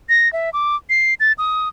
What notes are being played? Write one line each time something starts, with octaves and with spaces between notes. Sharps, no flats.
A#6
E5
D6
C7
A6
D#6